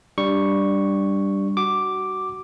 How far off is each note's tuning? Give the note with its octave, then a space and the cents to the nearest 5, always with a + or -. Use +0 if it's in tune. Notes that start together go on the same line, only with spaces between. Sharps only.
G3 +0 D4 +0 C#6 +0
F#4 +20 D6 +0